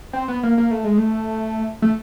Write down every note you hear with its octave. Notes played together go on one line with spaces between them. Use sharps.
C4
B3
A#3
A#3
A3
G#3
A3
A3